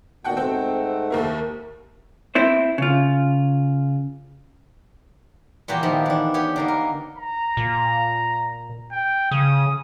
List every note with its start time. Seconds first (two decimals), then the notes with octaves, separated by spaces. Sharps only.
0.24 A#2 D#3 B3 F#4 F#5 G5
0.37 G#2 A3 C4 F#5 G5
1.10 D#2 A#3 E4
2.35 C4 E4 C5
2.78 C#3 F4
5.68 A#2 E3 F#4 G4 G5
5.83 D#3 F3 B3 E4
6.06 E3 D4
6.34 B3 G4 C#5
6.56 D3 A#3 D#4
6.68 A#4
7.17 A#5
7.57 A#2
8.92 G5
9.31 C#3 D#6